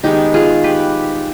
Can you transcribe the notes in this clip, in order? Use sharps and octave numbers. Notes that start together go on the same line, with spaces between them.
D#3 G#3 B3 D#4 G4
F4 G#4
G4 B4